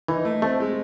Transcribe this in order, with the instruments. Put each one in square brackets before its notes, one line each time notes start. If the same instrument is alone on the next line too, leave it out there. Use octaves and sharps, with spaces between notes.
[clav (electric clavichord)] E3 [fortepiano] D#4
[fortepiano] A3
[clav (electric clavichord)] A3 [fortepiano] C4
[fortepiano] G#3